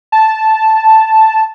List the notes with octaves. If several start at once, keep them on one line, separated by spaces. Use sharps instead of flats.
A5